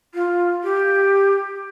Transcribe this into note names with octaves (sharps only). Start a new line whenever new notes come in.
F4
G4